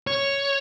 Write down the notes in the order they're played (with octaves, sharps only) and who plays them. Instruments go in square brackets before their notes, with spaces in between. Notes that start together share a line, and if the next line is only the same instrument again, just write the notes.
[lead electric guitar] C#5